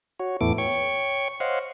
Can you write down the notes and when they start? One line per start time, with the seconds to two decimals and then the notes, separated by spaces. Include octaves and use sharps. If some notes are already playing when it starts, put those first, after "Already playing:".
0.20 F#4 C#5
0.41 E2 A2 B3 E4 A4 D6
0.58 C#5 G5 C#6
1.40 C5 C#5 D#5 F5 F#5